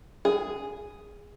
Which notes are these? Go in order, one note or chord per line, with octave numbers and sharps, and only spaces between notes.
G#4